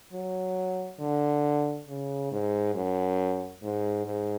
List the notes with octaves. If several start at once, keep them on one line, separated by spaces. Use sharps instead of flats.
F#3
D3
C#3
G#2
F#2
G#2
G#2